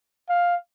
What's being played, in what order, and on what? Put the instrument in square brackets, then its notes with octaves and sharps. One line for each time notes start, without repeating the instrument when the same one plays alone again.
[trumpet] F5